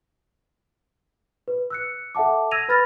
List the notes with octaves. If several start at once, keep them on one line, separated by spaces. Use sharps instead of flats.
B4
E6 F#6 C#7
A4 E5 F#5 A5 D6
E6 G#6 A#6 D#7 F7
B4 B5 F6 A6 A#6